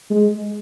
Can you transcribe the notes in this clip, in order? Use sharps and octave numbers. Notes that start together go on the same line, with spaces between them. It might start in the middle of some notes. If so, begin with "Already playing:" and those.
G#3